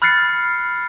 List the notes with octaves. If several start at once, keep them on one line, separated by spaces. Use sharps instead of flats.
B5 F6 F#6 A6 C7 C#7